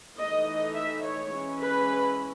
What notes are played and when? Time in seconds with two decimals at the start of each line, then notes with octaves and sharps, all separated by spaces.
0.16 E3 A3 D#4 D#5
0.74 E5
1.02 C#5
1.30 E3 G#3 C#4 E4
1.59 B4